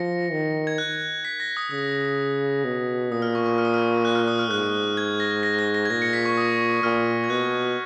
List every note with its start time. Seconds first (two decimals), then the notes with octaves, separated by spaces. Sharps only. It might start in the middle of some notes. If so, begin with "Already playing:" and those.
Already playing: F3 A#6 C#7
0.32 D#3
0.67 G#6
0.78 F#6
1.25 B6
1.40 A#6
1.57 D#6
1.71 C#3 D#6
2.65 B2
3.11 A#2 D#6
3.22 F6
3.35 C#6
3.46 C#6
3.58 F6
3.65 D#6
3.74 F6
4.05 F#6
4.15 F6
4.28 D#6
4.39 F6
4.51 G#2 F#6
4.97 G#6
5.20 A#6
5.43 A#6
5.59 A#6
5.75 A#6
5.85 G#6
5.90 A#2 A#6
6.02 A#6 C#7
6.13 B6
6.25 C#6
6.37 D#6
6.83 A#2 F6
7.24 G#6
7.30 B2 F#6